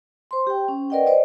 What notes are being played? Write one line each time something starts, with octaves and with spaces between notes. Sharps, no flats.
C5 C6
G4 G5
C#4
A#4 B4 D5 D#5 F#5 G5
C5 D5 D#5